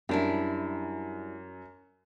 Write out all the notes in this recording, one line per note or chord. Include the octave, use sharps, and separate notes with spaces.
F#2 G3 D4 E4